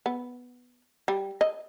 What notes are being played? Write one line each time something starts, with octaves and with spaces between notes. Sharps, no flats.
B3
G3
D#5